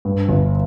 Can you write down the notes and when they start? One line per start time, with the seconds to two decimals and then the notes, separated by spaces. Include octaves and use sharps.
0.05 G2
0.29 G1